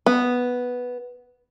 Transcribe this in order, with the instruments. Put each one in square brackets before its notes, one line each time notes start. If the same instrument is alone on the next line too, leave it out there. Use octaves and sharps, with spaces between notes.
[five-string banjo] B3